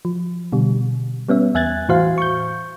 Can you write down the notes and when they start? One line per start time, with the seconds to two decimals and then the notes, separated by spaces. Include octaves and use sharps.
0.05 F3
0.52 B2 D3 G3
1.29 G3 B3 C#4 E5
1.54 E2 E5 G#5 F#6 G#6 A6
1.89 A2 E3 F#4 C5 F5 C6
2.18 C#6 G6